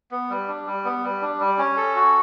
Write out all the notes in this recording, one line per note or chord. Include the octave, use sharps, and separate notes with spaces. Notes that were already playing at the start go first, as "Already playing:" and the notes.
B3
G3
D4
G3
B3
G3
D4
G3
C#4
A4
F#4